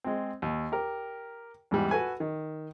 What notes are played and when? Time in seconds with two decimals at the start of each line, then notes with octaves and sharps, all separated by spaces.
0.05 G#3 C4
0.42 D#2
0.72 G4 A#4
1.71 E2 G#2 G3
1.91 F#4 A4 B4 G#5
2.20 D#3